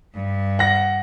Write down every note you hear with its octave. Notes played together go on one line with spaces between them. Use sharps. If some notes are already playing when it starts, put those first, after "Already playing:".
G2
F#5 A#6